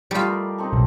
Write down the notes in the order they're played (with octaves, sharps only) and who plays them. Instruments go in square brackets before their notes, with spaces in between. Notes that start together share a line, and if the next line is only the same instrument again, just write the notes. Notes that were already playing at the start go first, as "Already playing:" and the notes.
[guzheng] G3 F4 [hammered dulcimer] A3 E4 D#5
[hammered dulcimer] G4 A#4 D5
C4 D#4 A4
[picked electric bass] B1 [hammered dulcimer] E3